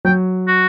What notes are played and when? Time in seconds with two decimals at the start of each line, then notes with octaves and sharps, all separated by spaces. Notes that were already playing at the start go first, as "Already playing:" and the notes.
0.05 F#3 G5
0.48 F#4